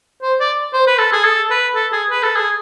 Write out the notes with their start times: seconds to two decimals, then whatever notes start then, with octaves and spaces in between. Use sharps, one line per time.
0.22 C5
0.40 D5
0.73 C5
0.87 B4
0.98 A4
1.12 G#4
1.25 A4
1.50 B4
1.75 A4
1.92 G#4
2.10 B4
2.23 A4
2.36 G#4